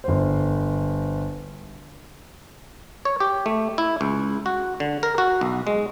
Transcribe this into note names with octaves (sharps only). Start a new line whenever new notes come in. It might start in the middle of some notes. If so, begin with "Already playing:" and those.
G1 C5
C#5
G4
A3
E4
C#2
F#4
D3
A#4
F#4
B1
G#3